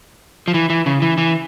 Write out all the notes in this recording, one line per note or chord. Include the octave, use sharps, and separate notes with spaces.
F3
E3
E3
C#3
E3
E3